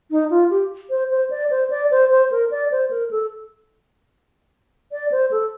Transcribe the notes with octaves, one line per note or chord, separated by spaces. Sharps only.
D#4
F4
G4
C5
C5
D5
C5
D5
C5
C5
A#4
D5
C5
A#4
A4
D5
C5
A4